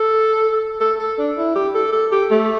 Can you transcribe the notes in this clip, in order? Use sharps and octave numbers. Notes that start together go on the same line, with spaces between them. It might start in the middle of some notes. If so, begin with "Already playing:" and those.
Already playing: A4
A4
A4
D4
E4
G4
A4
A4
G4
A3